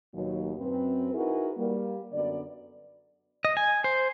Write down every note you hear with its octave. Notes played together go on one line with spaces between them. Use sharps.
D#2 B2 F#3
F#2 C4 B4
D#4 E4 F#4 G#4 A#4 B4
G3 A#3
F#2 D3 B3 D5
D#5
G#5
C5